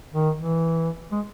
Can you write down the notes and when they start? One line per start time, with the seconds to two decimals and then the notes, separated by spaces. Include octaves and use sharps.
0.13 D#3
0.38 E3
1.12 G#3